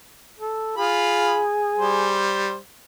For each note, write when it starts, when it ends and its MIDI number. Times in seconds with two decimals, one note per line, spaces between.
0.39 0.72 69
0.77 1.42 65
0.77 2.22 68
0.77 1.42 83
1.78 2.56 55
1.78 2.56 72